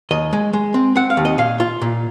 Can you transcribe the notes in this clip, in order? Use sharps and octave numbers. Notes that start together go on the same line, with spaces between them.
D#2 D#5
G#3
G#3
C4
C4 F#5
F5
D#2
D#5
A#2 F5
F4
A#2